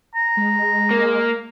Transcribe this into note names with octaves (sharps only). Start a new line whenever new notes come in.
A#5
G#3
A#3